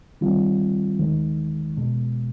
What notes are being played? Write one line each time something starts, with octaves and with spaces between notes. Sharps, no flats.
D#3 G3 C4 F4
D#2 D#3 G#3
E2 B2 G#3